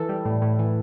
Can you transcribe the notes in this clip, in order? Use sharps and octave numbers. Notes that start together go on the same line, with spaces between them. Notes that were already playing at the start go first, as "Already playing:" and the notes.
Already playing: E3 A4
G3
A2
A2
E3